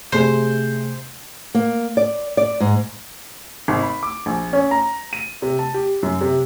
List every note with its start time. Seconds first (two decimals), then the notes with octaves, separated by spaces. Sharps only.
0.12 C3 A3 G#4 C5
1.55 A#3
1.97 D5
2.37 D5
2.60 G#2
3.68 G#1
3.83 B5
4.03 D6
4.26 A#1
4.53 C#4
4.71 A#5
5.13 D#7
5.42 C3
5.59 A5
5.74 G4
6.03 F#2
6.21 C3